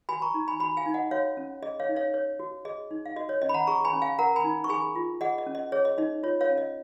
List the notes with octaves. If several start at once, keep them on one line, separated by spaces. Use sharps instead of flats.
F#4 G#5 B5
A#5 C#6
D#4
G#5 B5
F#4 G#5 B5
F5 G#5
D#4
D#5 F#5
F#4 C#5 F5
C#4
G#4 D#5
C#5 F5
D#4
C#5 F5
C#5
F#4
G#4 D#5
D#4
F5
F#4 D#5
C#5
C#4 D#5
B5
F#5 A#5
G#4 A#5 C#6
G#5 B5
C#4
F5 G#5
A#4 F#5 A#5
G#5 B5
D#4
C#6
G#4 G#5 B5
F4
G#4 D#5 F#5
D#5
C#4
D#5
G#4 C#5
D#5
D#4 D#5
F4 C#5
C#5 F5
C#4
D#5